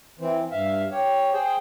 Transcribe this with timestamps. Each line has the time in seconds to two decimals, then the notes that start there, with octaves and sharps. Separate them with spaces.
0.19 E3 C4
0.51 G2 E5 F5
0.91 G4 C#5
1.33 G#4 C5 G5